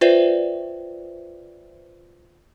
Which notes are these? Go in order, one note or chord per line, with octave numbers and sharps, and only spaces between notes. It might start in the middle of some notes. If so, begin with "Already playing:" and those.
F4 B4 C5 D5 E5 G5